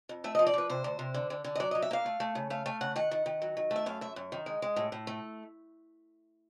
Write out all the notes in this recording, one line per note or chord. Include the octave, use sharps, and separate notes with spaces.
F2
A3 E5
D#5
F3
D5
F3 B4
C3 C5
D2
C3
D3
D3
D3
D#5
F#3 D5
D#5
F#3
E5
A#3 F5
A3
A3
C#3
A3 F5
A3 F5
C#3 F#5
D#3 F#5
D#3
D#3
F#3
D#3
A3 E5
F#2 F5
F#2 E5
F#2
D#3
G#3
G#3
A2
A2
A3